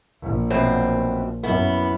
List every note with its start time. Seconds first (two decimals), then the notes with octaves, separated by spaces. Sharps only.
0.21 A#1
0.50 F#2 B2 C4
1.43 F#2 B3 E4